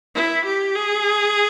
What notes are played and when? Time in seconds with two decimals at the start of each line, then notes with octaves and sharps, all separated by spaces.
0.15 E4
0.45 G4
0.75 G#4